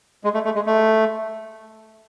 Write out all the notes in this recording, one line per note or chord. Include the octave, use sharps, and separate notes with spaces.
G#3
A3
A3
G#3
A3